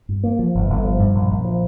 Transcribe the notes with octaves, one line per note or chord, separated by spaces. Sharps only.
G2
A#3
F3
G1
G1
F3
G2
A#1
A#1
F3